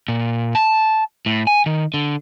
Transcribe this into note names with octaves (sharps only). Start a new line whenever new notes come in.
A#2
A5
A2
G#5
D#3
D3